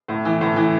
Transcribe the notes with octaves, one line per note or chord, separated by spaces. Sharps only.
A2
E3
A2
E3